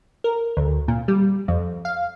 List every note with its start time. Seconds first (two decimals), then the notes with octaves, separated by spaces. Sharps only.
0.24 A#4
0.57 D2
0.88 A#2
1.08 G3
1.48 F2
1.85 F5